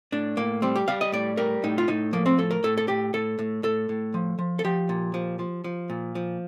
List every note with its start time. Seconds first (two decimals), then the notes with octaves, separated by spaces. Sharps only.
0.12 A2 D4
0.37 A2 A#3
0.62 G3 C4
0.76 G4
0.88 G3 F5
1.01 D#5
1.12 A2 D5
1.37 G3 A#4
1.64 A2 D#4
1.78 F4
1.88 A2 D#4
2.13 F3 A#3
2.26 C4
2.38 A2 A4
2.51 A#4
2.64 A2 A4
2.77 A4
2.88 A2 G4
3.14 A2 A4
3.39 A2
3.63 A2 A4
3.89 A2
4.14 F3
4.39 F3
4.59 A4
4.64 F3 G4
4.89 A#2
5.14 F3
5.39 F3
5.64 F3
5.90 A#2
6.15 F3